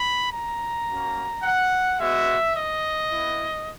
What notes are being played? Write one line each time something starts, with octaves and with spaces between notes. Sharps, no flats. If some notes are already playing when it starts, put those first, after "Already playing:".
Already playing: B5
A#5
A#3 C#4 F#4
F#5
G#3 B3 F#4 E5
D#5
B3 E4